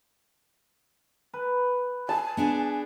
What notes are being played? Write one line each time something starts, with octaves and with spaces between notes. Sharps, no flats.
B4
G#5 A5
B3 D4 G#4